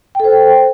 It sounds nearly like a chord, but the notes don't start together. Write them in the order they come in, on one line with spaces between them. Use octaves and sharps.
G5 A4 C5